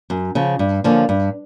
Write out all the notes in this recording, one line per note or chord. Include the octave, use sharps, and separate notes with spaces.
F#2
C#3 F3
G2
D3 F3 A#3 C#4
G2